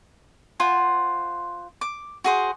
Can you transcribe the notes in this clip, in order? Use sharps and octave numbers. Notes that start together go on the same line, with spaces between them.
F4 C5 F#5 G#5
D6
F#4 G#4 C5